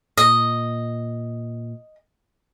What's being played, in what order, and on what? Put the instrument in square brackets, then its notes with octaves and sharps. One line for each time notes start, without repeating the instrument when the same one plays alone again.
[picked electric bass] A#2 [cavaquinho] D#5